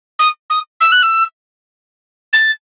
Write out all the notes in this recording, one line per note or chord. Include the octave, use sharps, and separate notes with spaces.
D#6
D#6
E6
F#6
E6
A6